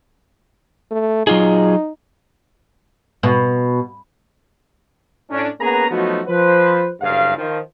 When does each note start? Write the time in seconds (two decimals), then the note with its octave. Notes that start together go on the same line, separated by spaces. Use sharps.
0.91 A3
1.27 F#3 D#4 F4 G#4
3.23 B2
5.30 A2 C#4 D4
5.61 A#3 B3 C#4 G#4 B4 A#5
5.90 F3 F#3 A3 B3 D#4 F#4
6.27 F3 B4 C5
7.01 F#1 G2 F5
7.37 D#3 F3